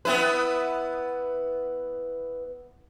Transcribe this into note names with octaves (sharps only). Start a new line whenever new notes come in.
B3 E4 B4